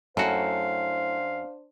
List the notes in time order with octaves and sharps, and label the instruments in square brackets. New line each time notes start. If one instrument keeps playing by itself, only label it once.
[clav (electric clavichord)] F#2 F#4 [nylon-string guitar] A3 E4 A4 [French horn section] D4 C5 [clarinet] F5